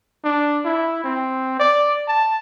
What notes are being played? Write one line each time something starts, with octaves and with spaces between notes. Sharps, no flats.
D4
E4
C4
D5
A5